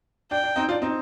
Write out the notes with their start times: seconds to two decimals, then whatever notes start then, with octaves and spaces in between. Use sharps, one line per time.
0.31 D4 G5
0.44 D4
0.56 C4 D#4
0.69 D4 F4
0.82 C4 D#4